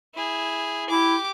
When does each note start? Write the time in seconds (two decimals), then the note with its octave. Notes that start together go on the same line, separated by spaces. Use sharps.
0.14 E4 G#4
0.90 E4 G4 D6